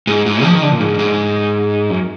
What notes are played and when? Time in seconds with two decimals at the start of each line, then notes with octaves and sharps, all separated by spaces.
0.07 G#2
0.26 G#2
0.44 F3
0.53 D#3
0.62 D3
0.72 A#2
0.80 G#2
0.99 G#2
1.90 F#2